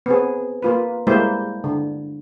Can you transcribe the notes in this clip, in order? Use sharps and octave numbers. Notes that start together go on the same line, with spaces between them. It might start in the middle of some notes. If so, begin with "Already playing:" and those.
B3 C4 G#4
A#3 F4 B4
G3 G#3 A#3 E4 C5
D3